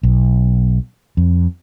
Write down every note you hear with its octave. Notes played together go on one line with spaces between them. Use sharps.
B1
F2